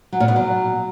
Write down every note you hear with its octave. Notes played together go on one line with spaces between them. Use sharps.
F#3
A#2
B2
F#3